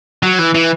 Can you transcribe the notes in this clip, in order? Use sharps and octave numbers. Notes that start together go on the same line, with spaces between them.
F#3
E3
E3